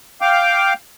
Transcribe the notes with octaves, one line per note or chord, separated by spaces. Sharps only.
F5 G5 D6